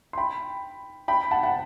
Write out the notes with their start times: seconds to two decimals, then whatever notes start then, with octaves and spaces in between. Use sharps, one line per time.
0.13 C6
0.17 G5 B5
1.08 G5 B5
1.31 F#5 A5
1.43 F#5